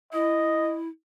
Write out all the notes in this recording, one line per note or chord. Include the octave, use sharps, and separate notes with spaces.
E4 D#5